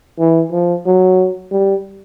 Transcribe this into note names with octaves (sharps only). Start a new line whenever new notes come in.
E3
F3
F#3
G3